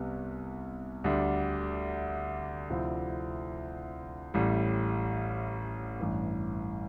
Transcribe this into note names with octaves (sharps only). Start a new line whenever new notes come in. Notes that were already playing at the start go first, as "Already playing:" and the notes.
Already playing: C2 C3 G3 B3
D2 D3 G3 D4
D2 C3 F3 C4 E4
A1 A2 G3
A1 G2 E3